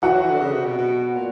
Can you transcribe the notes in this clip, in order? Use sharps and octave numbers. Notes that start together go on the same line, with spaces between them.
E3 F#4 F#5
F#3
E3
D3
C#3
C3
B2
B2
A#2